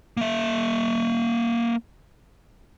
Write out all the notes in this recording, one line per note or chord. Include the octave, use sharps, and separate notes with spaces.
A#3 E5